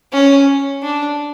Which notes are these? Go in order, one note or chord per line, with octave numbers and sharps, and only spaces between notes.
C#4
D4